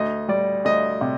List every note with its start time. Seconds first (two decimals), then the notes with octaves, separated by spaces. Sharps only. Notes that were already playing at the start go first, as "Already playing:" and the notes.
Already playing: D2 D#5
0.28 G3 D5
0.65 D2 D#5
1.01 C3